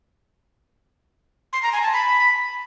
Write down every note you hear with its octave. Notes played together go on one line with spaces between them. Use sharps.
C6
A#5
G#5
A5
B5